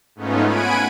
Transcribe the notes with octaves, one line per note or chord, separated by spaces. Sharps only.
G#2 A3 B3 C#4 D#4 F4
F#5 G#5 B5 G#6 D7 D#7